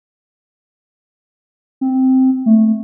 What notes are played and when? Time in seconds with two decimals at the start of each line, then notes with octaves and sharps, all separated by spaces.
1.81 C4
2.46 A3